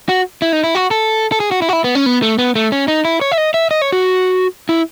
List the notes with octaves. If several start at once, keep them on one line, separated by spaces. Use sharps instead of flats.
F#4
E4
D#4
E4
F#4
A4
A4
G#4
F#4
E4
F#4
E4
B3
C#4
B3
A3
B3
A3
C#4
D#4
E4
C#5
E5
D#5
E5
D#5
C#5
F#4
E4